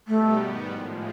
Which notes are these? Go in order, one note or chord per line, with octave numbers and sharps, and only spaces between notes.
B2 G3 A3 B3 D#4 G4
G#2 D#3 G3 B3
A2 F3 G#3